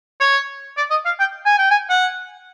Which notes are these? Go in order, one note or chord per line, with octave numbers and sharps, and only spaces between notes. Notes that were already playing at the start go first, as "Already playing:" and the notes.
C#5
D5
D#5
F5
G5
G#5
G5
G#5
F#5